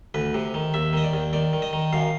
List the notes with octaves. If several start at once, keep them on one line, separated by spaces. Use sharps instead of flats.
D2 B4
C3
D#3
D#2 E5
D#3 D#5
D5
D#2
D#3 D5
D#3
D#5
D#3
F#2 F5